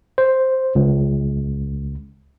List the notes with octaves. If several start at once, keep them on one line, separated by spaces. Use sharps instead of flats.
C5
C#2